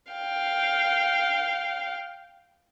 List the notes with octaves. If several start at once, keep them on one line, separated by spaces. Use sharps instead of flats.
F5 G5